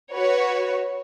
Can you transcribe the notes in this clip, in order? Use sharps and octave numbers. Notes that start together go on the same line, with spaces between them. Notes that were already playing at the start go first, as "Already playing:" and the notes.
F#4 B4 C#5